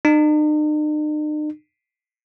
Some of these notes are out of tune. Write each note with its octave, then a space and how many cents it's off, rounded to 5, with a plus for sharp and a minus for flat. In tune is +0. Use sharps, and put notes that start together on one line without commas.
D#4 -45